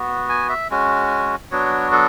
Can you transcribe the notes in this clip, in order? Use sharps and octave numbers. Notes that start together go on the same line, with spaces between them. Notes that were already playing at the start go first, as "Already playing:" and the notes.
Already playing: B3 F#4
G#5
E5
G#3 C#4 F#4
F#3 B3 D4 F#4 C#5
A4